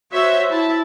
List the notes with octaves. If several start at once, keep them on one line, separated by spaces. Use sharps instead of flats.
F#4 C5 C#5 E5
E4 E5 A5